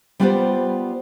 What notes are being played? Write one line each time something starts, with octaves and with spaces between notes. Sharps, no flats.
G3 B3 F4 G4 B4 C5